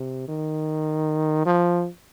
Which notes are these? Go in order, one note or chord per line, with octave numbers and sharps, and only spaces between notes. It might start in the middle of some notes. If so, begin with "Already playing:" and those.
Already playing: C3
D#3
F3